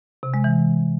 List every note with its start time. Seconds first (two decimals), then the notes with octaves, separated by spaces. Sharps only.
0.23 C3
0.34 G#3
0.44 E3